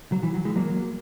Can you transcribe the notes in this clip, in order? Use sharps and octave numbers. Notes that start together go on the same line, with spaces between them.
F#3
E3
F#3
E3 G#3
F#3 A#3